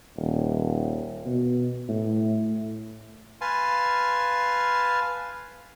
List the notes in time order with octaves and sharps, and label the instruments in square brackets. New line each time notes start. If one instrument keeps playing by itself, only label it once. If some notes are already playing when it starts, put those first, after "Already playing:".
[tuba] D#1
B2
A2
[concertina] B4 F5 G#5 A5 C6